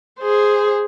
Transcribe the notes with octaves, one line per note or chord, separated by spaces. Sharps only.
G#4 C5